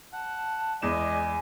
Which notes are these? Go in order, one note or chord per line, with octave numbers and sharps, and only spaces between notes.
F#5 A5
E2 G#3 D5 D#5 G#5 E7